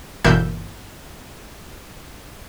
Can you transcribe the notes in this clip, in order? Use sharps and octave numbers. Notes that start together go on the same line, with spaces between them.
G1 B2 E3 A#3 E5 G6